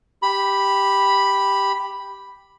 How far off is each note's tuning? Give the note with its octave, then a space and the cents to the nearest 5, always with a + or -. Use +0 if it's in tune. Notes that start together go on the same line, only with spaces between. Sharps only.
G4 +0 B5 +0